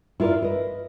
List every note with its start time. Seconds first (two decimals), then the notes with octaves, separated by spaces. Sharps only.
0.20 E4 F4 A#4 C#5 D5
0.42 B4 D#5